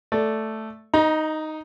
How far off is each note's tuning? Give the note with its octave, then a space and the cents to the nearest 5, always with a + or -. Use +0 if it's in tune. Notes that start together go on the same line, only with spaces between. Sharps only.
A3 +0 D5 +0
D#4 +0 A#5 +30